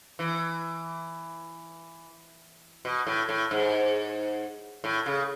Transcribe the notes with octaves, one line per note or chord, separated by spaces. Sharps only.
E3
B2
A2
A2
G#2
A2
C#3